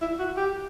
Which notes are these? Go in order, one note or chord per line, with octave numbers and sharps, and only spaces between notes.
E4
F#4
G4